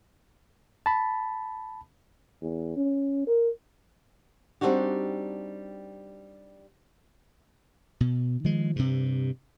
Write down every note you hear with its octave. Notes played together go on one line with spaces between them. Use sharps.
A5 B5
E2
C#4
A#4
G3 C4 D4 D#4 F#4 G4
B2
D#3 F3 G#3
G2 C3